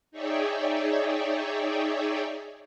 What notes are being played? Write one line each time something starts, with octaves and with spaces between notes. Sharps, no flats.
D#4 G#4 C#5 D5 E5 G5